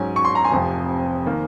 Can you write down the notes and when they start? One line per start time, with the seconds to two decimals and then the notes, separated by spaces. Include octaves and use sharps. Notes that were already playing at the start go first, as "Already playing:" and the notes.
Already playing: G#2 F#3 C#4 G#5
0.16 C#6
0.25 C6
0.35 A#5
0.44 G#5 C6
0.51 F1 F2 C3 F3
1.26 D#3 A#3